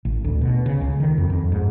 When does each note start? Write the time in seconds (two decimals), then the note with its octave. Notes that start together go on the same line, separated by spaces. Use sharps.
0.05 A1
0.24 D2
0.41 B2
0.66 C#3
0.81 C#2
1.00 D#3
1.18 F2
1.30 F2
1.52 G#2